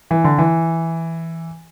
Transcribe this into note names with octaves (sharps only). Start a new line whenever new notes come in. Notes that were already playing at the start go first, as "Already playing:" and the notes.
E3
D3
E3